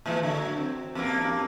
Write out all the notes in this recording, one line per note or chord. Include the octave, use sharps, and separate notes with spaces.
A2 E3 G#3
D3 F#3
C4
E2 G2 A#3